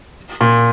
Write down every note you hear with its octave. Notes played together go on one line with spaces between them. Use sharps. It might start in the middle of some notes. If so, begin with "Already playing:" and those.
A#2